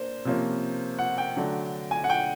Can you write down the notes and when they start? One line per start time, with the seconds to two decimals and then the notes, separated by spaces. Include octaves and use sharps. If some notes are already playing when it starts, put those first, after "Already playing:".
Already playing: A#3 D4 C5
0.25 C3 F3 A#3 C#4
0.99 F#5
1.18 G5
1.36 D3 F#3 A3 D4
1.91 G#5
2.04 F#5
2.10 G5